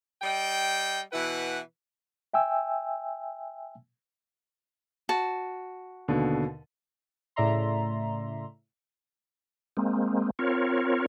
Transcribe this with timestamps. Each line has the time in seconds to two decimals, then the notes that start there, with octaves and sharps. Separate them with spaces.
0.22 G3 D#5 G5
1.12 B2 E3 E4 B4 F#5
2.34 E5 G5 G#5 E6
5.09 F#4 A5
6.08 D#2 B2 D3
7.36 A2 C#3 D5 E5 A#5 C6
9.77 G#3 A#3 C4
10.39 C4 F4 A#4 C#5